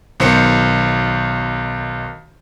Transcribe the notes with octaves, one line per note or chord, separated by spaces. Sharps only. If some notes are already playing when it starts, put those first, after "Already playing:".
B1 D#3 C5 C#7